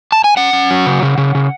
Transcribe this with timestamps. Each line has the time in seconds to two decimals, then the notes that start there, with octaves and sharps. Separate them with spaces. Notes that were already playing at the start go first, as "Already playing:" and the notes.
0.12 A5
0.24 G#5
0.37 C#4 F#5
0.53 C#4
0.70 F#3
0.86 C#3
1.03 C#3
1.18 C#3
1.35 C#3